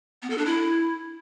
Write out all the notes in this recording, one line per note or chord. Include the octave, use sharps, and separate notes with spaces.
B3
A4
D4
E4